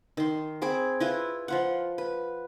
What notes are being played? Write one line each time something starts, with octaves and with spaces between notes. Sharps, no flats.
D#3 C6
C4 G#4 B5 D6
E4 F4 B4
F3 F4 F#5
B4